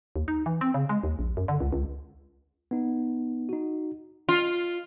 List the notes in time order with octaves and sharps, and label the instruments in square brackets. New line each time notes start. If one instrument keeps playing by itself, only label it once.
[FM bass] D#2
D#4
E3
C4
C#3
G#3
D#2
A#1
F#2
D3
C#2
C#2
[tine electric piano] B3 D#4
D#4 F#4
[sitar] F4